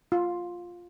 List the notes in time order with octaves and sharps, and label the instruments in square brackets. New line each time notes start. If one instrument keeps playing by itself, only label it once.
[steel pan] F4